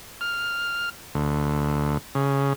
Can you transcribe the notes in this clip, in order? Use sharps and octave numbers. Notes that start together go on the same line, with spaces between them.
F6
D2
C#3